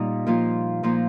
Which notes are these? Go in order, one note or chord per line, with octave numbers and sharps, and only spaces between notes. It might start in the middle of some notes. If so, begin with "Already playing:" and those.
Already playing: A#2 G3 A#3 D#4
A#2 F3 A#3 F4
A#2 F3 A#3 F4